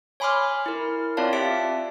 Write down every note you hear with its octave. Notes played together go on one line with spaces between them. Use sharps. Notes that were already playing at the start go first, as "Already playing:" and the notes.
C#5 G#5 B5 C6 D6 F6
E4 A#4
C4 F4 C#5 D5 F5 A5
G4 E5 B6 D7